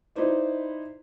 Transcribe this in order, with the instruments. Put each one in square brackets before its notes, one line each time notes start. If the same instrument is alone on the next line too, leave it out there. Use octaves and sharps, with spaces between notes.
[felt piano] D#4 E4 B4 C5 D5